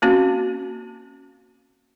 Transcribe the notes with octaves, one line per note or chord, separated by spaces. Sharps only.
A#3 C4 C#4 F#4